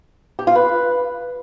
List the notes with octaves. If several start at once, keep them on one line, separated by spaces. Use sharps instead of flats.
G4
F4
B4